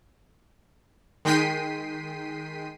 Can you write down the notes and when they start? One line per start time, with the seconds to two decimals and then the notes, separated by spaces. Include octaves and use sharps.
1.25 D#3 G#3 G5 B6 C7 D#7